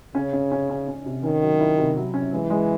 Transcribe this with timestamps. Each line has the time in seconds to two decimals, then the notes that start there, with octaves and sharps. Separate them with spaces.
0.15 C#3 C#4
0.33 C#4
0.52 C#4
0.70 C#4
0.88 C#4
1.06 C3
1.23 D#3 C#4
1.42 F#3
1.60 E4
1.78 C3
1.96 F#3
2.14 C#4
2.33 E3 G#3
2.50 G#3